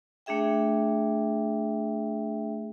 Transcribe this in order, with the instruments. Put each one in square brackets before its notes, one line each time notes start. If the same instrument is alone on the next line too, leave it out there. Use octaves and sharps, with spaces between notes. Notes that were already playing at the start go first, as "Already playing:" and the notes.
[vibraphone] A3 D4 G#4 E5 G5